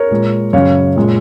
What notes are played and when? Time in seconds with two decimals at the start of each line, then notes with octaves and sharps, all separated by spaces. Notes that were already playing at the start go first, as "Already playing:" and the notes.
Already playing: A#4 C#5
0.11 A#2 G#3
0.53 F#2 C#3 F#3 C#5 F5
0.96 A#2 G#3